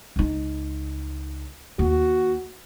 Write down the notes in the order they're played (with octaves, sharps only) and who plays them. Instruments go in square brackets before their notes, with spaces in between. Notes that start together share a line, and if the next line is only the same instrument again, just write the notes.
[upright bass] C#2 D#4
[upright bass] D#2 [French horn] F#4